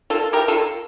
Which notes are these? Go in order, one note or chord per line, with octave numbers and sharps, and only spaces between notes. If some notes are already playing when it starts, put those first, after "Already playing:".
A#3 F4 A4
E3 G4 A#4
F4 A4
A#3